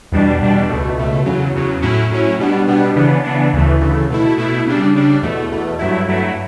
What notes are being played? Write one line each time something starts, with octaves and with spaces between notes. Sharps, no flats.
E2 B2 G3 D4
E2 B2 G3 D4
C#2 B2 A3
C#2 B2 A3
E2 C#3 F#3
E2 C#3 F#3
A2 F#3 C#4 E4
A2 F#3 C#4 E4
B2 G3 B3 D4
B2 G3 B3 D4
C#3 E3 B3 D4
C#3 E3 B3 D4
D2 C#3 E3 A3
D2 C#3 E3 A3
B2 A3 E4
B2 A3 E4
C#3 G3 D4
C#3 G3 D4
E2 B2 A3
E2 B2 A3
G2 F#3 A3 E4
G2 F#3 A3 E4